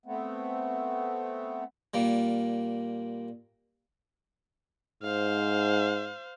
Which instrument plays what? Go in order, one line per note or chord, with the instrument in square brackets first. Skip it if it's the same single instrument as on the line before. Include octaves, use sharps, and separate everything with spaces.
[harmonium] A3 B3 C4
[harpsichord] A#2 G3 A#3
[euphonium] G#2 [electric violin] C5 F5